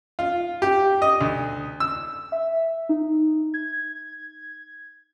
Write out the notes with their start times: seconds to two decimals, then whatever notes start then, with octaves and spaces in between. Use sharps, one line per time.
0.19 F4
0.62 G4
1.02 D#5
1.21 D2
1.80 E6
2.32 E5
2.89 D#4
3.54 G#6